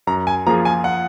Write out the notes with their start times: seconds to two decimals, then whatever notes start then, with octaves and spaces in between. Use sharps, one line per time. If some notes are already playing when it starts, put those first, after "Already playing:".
0.07 F#2 A#5
0.27 G#5
0.46 F3 A#3 F4 G#4 A#5
0.65 G#5
0.84 F#5